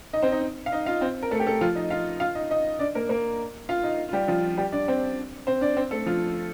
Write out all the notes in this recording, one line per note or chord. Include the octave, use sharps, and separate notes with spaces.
D#4 D#5
C4 C5
D#4 D#5
F5
D#4 D#5
F4 F5
C4 C5
A#4
A3 A4
G4
A3 A4
F3 F4
D#4 D#5
F4 F5
F4 F5
D#4 D#5
D#4 D#5
D4 D5
A#3 A#4
A#3 A#4
F4 F5
D#4 D#5
F4
G3 G4
F3 F4
G3 G4
D4 D5
C4 C5
C4 C5
D4 D5
C4 C5
A3 A4
F3 F4